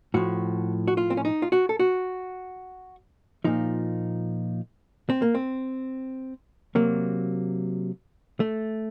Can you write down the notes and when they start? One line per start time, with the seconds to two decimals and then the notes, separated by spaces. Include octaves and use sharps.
0.14 A2 F3 F#4
0.88 F#4
0.97 F4
1.10 C4
1.17 C#4
1.25 D#4
1.42 F4
1.52 F#4
1.69 A4
1.80 F#4
3.44 A#2 F3 D#4
5.10 C4
5.22 A#3
5.35 C4
6.75 C3 F#3 A#3
8.40 A3